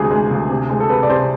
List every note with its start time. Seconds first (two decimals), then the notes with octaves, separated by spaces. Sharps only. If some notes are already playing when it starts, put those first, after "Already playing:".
Already playing: D2 C3 G#3 G#4
0.11 G#3
0.31 D2
0.50 C3
0.70 G#3
0.80 A4
0.89 C3 B4
1.03 D5
1.09 C3 C5